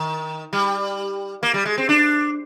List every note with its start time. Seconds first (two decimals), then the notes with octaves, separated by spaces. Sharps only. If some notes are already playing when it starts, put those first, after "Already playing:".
Already playing: D#3
0.53 G3
1.43 A#3
1.54 G3
1.65 G#3
1.78 C4
1.89 D4